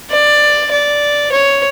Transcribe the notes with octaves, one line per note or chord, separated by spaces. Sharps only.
D5
D5
C#5